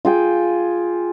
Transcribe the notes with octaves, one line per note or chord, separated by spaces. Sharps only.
F4 G#4 G5